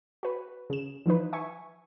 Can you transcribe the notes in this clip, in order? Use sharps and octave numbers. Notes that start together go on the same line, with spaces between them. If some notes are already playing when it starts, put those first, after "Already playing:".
F#4 B4
C#3 E7
E3 F3 D#4 B4
E5 G#5 C#6